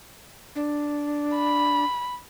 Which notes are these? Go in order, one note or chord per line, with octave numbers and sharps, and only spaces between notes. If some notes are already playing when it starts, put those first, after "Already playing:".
D4
B5